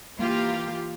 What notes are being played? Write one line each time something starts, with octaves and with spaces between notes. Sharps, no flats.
E3 A#3 F4 G4 F5